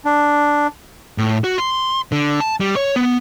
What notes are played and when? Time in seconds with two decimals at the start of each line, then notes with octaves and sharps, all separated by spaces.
0.05 D4
1.18 A2
1.44 F#4
1.58 C6
2.12 D3
2.40 A5
2.60 G3
2.76 C#5
2.96 B3